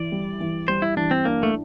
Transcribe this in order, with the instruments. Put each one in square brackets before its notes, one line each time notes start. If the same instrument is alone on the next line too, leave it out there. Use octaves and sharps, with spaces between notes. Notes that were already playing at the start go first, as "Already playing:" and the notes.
Already playing: [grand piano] E3 [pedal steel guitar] D5
[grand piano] G3
E3
[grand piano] G3 [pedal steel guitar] C5
[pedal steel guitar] E4
[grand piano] E3 [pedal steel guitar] D4
[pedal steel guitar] C4
[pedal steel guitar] A#3 [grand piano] D4
[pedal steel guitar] A3